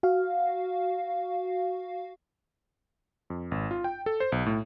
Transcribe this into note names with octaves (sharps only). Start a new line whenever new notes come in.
F#4 F5
F2
G#1
F4
G5
A4
C5
B1
A2